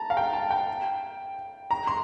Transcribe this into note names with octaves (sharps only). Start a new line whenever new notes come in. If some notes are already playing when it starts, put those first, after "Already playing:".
Already playing: A5 A#5
F5
G5
A5
G5
A#5
C6